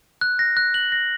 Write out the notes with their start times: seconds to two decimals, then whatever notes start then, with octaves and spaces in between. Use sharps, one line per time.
0.21 F#6
0.39 A#6
0.57 F#6
0.74 F#7
0.92 A#6